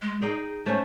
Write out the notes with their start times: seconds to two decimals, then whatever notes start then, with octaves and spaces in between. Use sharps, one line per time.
0.02 G#3
0.22 D#4 G#4 D#5 G5
0.66 A3 C#4 C5